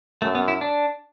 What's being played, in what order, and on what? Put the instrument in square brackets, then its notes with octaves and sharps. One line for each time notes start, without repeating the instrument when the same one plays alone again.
[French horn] F#2 [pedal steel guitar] A3
[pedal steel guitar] B3
E4
D4